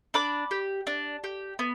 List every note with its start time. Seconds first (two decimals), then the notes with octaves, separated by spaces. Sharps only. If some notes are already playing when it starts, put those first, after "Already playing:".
0.14 D4 B5 D6
0.51 G4
0.87 D4
1.24 G4
1.59 B3